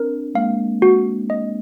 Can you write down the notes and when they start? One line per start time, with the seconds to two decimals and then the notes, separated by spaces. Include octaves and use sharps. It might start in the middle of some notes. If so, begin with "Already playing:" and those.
Already playing: C4 D4 A#4
0.35 G#3 A#3 F5
0.82 F#4
1.30 D#5